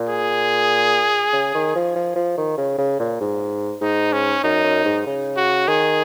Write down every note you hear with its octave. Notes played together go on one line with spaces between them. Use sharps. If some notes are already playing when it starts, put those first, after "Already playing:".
Already playing: A#2
G#4
C#3
D#3
F3
F3
F3
D#3
C#3
C#3
A#2
G#2
G#2 D#4
C#4
F#2 D#4
F#2
G#2
C#3
F#4
D#3 G#4